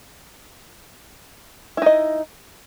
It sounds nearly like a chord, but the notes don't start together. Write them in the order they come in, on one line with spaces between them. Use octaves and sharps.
E4 D#4 D#5